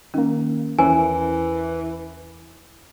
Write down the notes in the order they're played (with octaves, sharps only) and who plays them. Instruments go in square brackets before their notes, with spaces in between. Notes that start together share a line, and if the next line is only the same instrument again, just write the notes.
[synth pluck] D#3 A#3 [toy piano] C#4
[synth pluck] E2 C#4 E4 [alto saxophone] E3 [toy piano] A#4 C5 [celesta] G#5